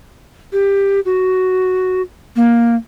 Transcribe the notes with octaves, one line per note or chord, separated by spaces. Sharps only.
G4
F#4
A#3